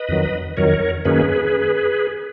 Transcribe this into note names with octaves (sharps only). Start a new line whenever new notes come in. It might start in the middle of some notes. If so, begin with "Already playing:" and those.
Already playing: B4 D#5
F2 D#3 F#3
F2 D#3 F#3 A#4 C#5
F#2 D#3 A#3 C#4 G#4 B4